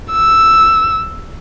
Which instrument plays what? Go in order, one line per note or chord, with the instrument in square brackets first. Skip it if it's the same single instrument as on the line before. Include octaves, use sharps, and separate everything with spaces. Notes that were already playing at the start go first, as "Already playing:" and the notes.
[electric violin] E6